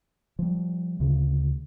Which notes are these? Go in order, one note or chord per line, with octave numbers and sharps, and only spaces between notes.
F3 G3
D2 C#3